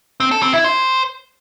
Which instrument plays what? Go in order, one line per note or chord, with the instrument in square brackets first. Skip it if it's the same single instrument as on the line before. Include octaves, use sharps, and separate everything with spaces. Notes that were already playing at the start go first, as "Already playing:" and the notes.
[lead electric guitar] C4
A4
C4
E4
C5